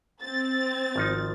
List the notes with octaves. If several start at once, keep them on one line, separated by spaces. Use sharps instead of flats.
C4 A6
G#1 F3 D#4